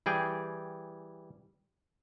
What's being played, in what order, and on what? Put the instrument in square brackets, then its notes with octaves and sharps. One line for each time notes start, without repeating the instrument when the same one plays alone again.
[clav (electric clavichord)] E3 G3 G#4 G5